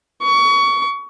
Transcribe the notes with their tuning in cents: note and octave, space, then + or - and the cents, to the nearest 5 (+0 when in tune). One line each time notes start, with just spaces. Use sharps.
C#6 +25